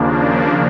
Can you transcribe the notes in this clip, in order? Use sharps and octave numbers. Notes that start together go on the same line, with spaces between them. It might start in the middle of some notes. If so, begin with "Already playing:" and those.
Already playing: D#2 C#3 F3 A#3 D4